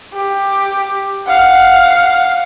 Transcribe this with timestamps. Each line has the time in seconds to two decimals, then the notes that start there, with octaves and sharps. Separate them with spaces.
0.13 G4
1.27 F5 F#5